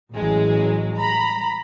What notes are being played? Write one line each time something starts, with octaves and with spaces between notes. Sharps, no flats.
A1 F#3 G#3
A#5 B5